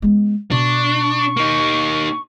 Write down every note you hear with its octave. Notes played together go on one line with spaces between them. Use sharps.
G#3 B3
B2 D4 C#6
A#3 D#4